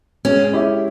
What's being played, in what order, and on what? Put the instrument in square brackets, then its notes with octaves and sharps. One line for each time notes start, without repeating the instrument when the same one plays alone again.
[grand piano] G#3 [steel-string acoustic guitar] C#4
[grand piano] C#4 E4 G4